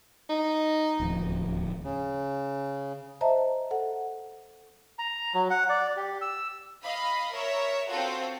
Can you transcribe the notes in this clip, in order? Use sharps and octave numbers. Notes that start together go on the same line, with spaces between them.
D#4
D1 D#2 F3
C#3
C5 D#5 E5 A5 A#5
A4 F#5
A#5
F#3
F#5
D5
G4
E6
D#5 F5 B5
A#4 C#5 E5
C4 F4 F#4 A4